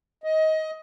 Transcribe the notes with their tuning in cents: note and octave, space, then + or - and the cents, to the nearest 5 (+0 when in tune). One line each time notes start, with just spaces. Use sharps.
D#5 +20